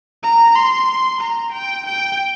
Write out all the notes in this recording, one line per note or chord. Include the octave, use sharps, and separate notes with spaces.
A#5
C6
A#5
G5
G5